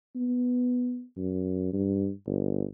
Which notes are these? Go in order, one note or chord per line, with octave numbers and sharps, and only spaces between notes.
B3
F#2
G2
G1